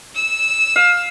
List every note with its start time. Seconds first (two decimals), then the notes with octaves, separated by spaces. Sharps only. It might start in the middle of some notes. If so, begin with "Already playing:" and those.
0.15 E6 E7
0.76 F5